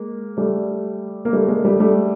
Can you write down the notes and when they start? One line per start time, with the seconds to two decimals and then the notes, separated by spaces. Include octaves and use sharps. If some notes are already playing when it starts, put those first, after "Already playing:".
Already playing: G#3 A#3
0.37 G3 A3
1.25 A#3
1.33 G3 A3
1.48 G#3 A#3
1.64 G3 A3
1.80 G3 A3